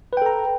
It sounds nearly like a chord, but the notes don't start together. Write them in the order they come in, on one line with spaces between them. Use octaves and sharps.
B4 G5 A4 A#5